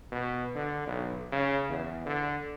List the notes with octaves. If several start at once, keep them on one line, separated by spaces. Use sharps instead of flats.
B2
D3
B1
C#3
E2
D3